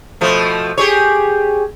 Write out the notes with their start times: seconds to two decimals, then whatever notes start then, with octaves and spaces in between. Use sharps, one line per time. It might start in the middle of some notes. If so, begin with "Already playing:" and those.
0.21 B2 F3 A3
0.78 G4 G#4 C#5